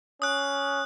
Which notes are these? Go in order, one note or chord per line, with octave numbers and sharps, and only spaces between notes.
C#4 D#6 F#6